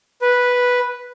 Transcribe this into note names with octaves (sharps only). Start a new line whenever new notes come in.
B4